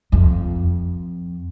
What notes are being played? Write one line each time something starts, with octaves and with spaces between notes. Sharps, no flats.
F2